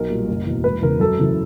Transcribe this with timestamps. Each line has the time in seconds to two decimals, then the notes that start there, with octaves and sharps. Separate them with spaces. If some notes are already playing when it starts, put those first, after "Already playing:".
Already playing: B1 A#4
0.10 A#2 G3
0.28 F#1
0.46 E2 B2
0.64 E1 B4
0.82 E2 C#3 A#4
1.00 F#2 A4
1.19 C#3 E3